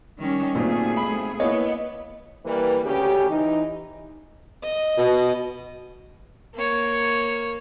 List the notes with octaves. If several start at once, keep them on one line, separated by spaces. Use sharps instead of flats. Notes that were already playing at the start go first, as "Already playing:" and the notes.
D#3 G3 C#4
B1 A#2 A3 C4 G#4
B5
A#3 B3 E4 C#5 D#5
E3 G3 A#3 B4
D2 C#3 C#4 G4
E3 D#4
D#5
B2
A#3 C#5